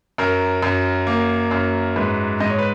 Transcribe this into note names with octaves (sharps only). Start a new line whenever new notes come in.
F#2 A#4
F#2
A#3
F#2
G#2 B4
G#2 D#5
C#5
B4